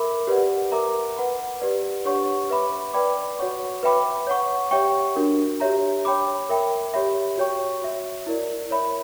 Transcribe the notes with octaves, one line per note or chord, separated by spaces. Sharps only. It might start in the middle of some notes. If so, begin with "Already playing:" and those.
Already playing: A#4 E5 B5 D6
G4 B4 D5 F#5
A#4 E5 A#5 D6
B4 F#5 B5
G4 B4 D5
D4 G4 C#5 F#5 C#6
B4 E5 B5 D6
B4 D5 G5 B5 D6
F#4 C#5 F#5 C#6
B4 E5 G5 B5 D6
C#5 F#5 C#6
G4 C#5 E5 G5 C#6
D4 F#4 A#4
G4 C#5 E5 A#5
C#5 G5 B5 D6
A#4 E5 G5 B5
G4 C#5 E5 B5
F#4 C#5 G5 C#6
F#4 C#5 E5
E4 A#4 D5
A#4 C#5 E5 B5